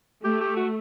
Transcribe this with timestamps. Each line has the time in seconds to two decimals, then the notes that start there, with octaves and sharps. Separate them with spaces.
0.24 A3 G4
0.41 G4
0.57 F#4